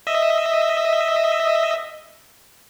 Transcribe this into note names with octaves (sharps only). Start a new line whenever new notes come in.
D#5 E5